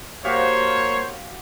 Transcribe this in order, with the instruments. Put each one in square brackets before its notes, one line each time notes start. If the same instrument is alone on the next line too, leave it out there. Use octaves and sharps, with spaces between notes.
[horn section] A#3 C5 [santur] F#4 G4 F5 [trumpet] C#5